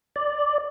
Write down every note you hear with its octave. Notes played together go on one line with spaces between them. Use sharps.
D5